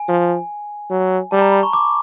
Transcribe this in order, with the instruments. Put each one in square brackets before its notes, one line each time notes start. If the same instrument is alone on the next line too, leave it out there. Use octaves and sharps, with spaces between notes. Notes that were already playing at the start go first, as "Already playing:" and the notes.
Already playing: [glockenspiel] G#5
[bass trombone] F3
F#3
[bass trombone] G3 [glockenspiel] A5
[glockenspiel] A#5
B5
C#6
D6